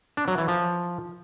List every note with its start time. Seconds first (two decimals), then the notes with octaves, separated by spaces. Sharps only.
0.17 D4
0.28 F#3
0.38 E3
0.48 F3